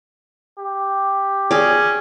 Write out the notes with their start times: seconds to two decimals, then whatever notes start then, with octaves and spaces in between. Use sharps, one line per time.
0.58 G4
1.51 C#4 G#4 D5